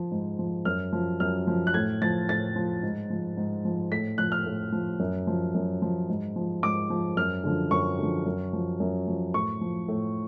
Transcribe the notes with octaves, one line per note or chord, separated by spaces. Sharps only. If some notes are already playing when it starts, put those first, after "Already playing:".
Already playing: F3
G#2
F3
F#2 F6
F3
F#2 F6
F3
F#6
A2 G#6
F3 A6
A2 A6
F3
G#2
F3
G#2
F3
A2 B6
F3 F#6
F6
A2
F3
F#2
F3
F#2
F3
G#2
F3
G#2 D6
F3
F#2 F6
D3 F3
F#2 C#6
D3 F3
F#2
F3
F#2
F3
A2 C#6
F3
A2